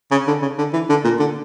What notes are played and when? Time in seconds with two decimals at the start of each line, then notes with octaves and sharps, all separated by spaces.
0.11 C#3
0.28 D3
0.42 C#3
0.58 D3
0.73 E3
0.89 D3
1.04 A#2
1.19 D3